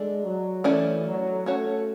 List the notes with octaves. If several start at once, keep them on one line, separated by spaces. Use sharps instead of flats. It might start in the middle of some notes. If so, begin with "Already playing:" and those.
Already playing: G#3 D4 A4
F#3
E3 A3 C#4 E4 A4 D5
F#3
A3 C#4 F#4 C#5